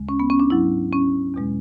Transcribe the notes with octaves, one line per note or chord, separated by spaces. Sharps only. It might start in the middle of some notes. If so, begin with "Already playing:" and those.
Already playing: D2 C#3 G#3
C#4
B3
C#4
D4
G#2 F#3 E4
C#4
E2 B2 G#3